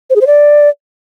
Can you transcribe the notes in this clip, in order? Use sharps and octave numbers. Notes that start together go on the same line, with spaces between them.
C5
G#4
C5
D5